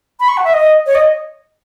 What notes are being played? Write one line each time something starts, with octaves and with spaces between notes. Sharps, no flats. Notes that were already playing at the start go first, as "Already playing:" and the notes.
B5
C#6
F#5
E5
D#5
C#5
D#5